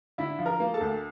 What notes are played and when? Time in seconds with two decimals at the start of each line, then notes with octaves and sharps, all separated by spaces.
0.18 D3 E4 E5
0.39 F3
0.46 A#4 A#5
0.60 A#3
0.74 A4 A5
0.81 D2